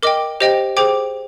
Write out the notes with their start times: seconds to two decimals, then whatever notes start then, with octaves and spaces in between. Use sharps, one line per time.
0.03 A#4 D#5 G5 D6
0.40 G4 C5 D#5 G5
0.77 G#4 C5 G5 D6